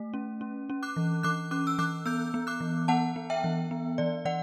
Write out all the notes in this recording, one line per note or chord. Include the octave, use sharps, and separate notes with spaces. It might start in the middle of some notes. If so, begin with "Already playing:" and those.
Already playing: A3
C#4
C#4
C#4
D6 F#6
E3
E3 D6 F#6
C#4 D6 F#6
E6
E3 D6 F#6
B3 E6 G6
B3
D6 F#6
E3
B3 F#5 A5
B3
E5 G5
E3
B3
E3 D5
E3 D5 F#5